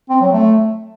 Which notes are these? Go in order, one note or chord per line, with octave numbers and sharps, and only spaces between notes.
C4
F#3
A3